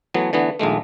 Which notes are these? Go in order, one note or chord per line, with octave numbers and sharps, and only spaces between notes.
E3 F#3 A3 B3
D3 E3 A3 B3
A#1 D#2 G#3 A3